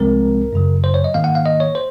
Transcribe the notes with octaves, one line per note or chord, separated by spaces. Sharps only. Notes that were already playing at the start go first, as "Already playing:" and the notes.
Already playing: C2 C3 F3 G#3 C4 A#4
F#2 C#3 F#3
C5
C#5
D#5
G#2 D#3 A#3 F5
F#5
F5
D#5
C#5
C5